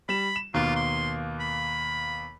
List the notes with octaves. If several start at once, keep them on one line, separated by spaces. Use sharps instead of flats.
G3 B5 E7
E7
D#2 B2 A#3 F4
C6
B5